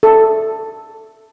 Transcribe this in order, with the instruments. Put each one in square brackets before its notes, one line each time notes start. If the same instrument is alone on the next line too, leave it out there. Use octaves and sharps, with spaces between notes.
[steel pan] A4